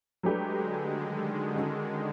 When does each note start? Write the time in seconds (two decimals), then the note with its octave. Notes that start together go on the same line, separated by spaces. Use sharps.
0.23 F#3 G#3 A3 D4 G4 B4
0.56 D3
0.90 D#3
1.56 G#3 C#4 F#4 A4